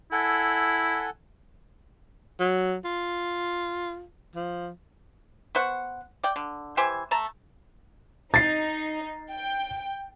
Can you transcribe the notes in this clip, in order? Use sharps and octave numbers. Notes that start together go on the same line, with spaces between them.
E4 A4 F#5 G#5
F#3
F4
F3
B3 C5 F#5 C#6
D5 G5
D3
E3 G4 C5 G#5
A3 A5 A#5
D#4 A6 C7
G5